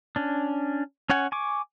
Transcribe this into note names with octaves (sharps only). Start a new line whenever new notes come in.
C#4 D4
C#4 C#5 F#5 G#5
G#5 C#6 D6